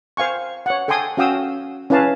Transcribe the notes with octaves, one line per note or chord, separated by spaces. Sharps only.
C5 F5 G#5 C#6
C#5 F#5
A4 G5 G#5 C6 D#6
C#4 F#4 F5 G5 D#6 E6
C#4 E4 B4 F5 A5